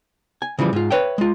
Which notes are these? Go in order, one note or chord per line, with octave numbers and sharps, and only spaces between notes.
G#5
C#3 E3 F3 G3
G#2 F4
B4 C#5 E5 G5
G#3 F4